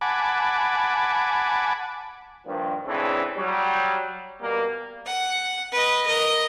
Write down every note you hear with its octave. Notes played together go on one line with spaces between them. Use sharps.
F#5 G#5 A5 B5 D6
G2 A#2 D#3 F3
A2 C#3 E3 C4 D4
F#3 G3
B2 G3 A#3
F#5
B4 D#5
A#4 D#5